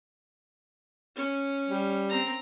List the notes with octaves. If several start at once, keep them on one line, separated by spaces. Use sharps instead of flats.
C#4
G3
C4 A#5